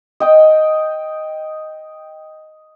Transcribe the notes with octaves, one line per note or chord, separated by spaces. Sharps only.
D#5 G5 D#6